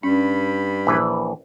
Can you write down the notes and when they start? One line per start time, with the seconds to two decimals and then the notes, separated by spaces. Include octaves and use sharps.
0.03 G2 G3 C#4 B5
0.87 A#1 E3 B4